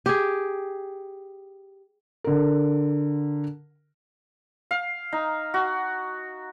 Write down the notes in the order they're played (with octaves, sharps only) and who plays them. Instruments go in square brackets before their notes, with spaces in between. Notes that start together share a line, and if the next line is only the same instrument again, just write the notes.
[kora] G4 G#4
[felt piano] D3 A#4
[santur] F5
D#4
F#4